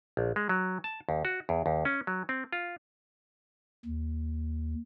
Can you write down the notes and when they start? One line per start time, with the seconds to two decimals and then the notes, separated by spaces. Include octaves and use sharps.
0.17 A#1
0.36 G#3
0.49 F#3
0.84 A5
1.09 D#2
1.25 F#4
1.49 E2
1.66 D#2
1.85 C#4
2.07 F#3
2.29 C4
2.53 F4
3.85 D#2